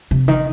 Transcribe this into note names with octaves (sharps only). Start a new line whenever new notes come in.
C3
D#3